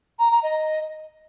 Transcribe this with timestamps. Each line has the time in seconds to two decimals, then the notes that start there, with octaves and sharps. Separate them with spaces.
0.19 A#5
0.31 A#5
0.43 D#5